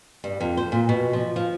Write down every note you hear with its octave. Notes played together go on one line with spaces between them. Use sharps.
G2
F2
C5
A#2
B2
F3
F3